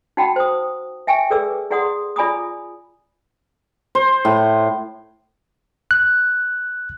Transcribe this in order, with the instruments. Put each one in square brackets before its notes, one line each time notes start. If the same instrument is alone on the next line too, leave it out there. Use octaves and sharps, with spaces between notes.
[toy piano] D#4 F#4 F#5 G5 A5 B5
C5 D#6
E5 G5 G#5 C#6
G#4 A4 B4 D5 D6 E6
E4 G#4 D5 F#5 C6 D#6
F4 D5 G#5 B5 D6 D#6
[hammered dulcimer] C5
A2
[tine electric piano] F#6